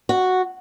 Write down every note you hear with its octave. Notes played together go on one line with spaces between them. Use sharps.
F#4